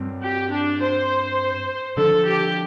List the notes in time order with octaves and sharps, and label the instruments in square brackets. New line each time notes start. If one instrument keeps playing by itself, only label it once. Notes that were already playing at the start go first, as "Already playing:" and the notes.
Already playing: [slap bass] G2 G3 C4
[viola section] G4
D4
C5
[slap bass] D3 F3 D4 [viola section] A4
[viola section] G4